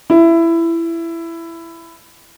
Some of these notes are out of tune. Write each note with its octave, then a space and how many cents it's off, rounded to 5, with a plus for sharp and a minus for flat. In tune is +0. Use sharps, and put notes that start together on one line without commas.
E4 +15